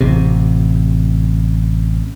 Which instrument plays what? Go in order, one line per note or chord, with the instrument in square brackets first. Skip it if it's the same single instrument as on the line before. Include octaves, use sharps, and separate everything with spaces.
[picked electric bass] A1 C3